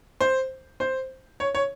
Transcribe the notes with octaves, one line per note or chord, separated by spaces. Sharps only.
C5
C5
C#5
C#5